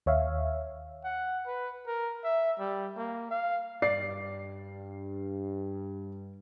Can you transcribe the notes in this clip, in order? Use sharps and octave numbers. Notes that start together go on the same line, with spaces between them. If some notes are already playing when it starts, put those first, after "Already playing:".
D#2 C#5 E5 F5
F#5
B4
A#4
E5
G3
A#3
F5
G2 D5 C7